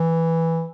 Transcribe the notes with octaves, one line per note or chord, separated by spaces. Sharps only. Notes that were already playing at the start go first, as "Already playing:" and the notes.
Already playing: E3